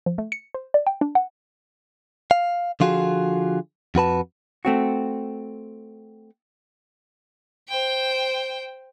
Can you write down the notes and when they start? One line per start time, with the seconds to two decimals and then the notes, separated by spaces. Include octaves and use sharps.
0.06 F3
0.18 A3
0.32 C#7
0.54 C5
0.74 D5
0.87 G5
1.01 D4
1.15 F#5
2.31 F5
2.80 D3 F3 F4 F#4 G#4
3.95 F2 F#4 B4 A5
4.65 A3 C4 F#4
7.69 C5 G5